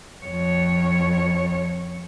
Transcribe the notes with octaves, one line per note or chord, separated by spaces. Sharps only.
F2 C#5